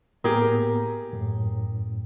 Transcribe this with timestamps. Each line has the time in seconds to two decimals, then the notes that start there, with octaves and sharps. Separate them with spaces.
0.24 A2 A#3 B3 G4 G#4 A#4
1.13 F#2 A2